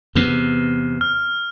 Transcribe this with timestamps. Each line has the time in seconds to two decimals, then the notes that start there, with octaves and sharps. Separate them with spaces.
0.15 E2 C3 B3
1.01 F6